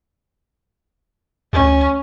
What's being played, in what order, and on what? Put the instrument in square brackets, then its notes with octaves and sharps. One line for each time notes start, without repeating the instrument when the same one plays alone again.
[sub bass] D2 [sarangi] C#4